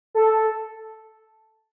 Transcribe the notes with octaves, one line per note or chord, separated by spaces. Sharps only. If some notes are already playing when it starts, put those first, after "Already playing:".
A4